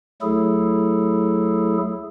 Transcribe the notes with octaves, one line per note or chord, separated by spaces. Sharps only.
D2 F#3 A3 E4 G#4 A4